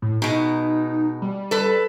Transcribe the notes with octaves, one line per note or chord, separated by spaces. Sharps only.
A2
B2 G#3 D#4
G3
A4 B4